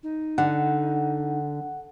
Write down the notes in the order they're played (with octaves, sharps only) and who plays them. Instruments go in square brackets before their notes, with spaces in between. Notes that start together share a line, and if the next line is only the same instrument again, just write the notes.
[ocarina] D#4
[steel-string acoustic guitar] D3 [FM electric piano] F#5